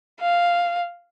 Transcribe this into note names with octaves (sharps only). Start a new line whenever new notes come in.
F5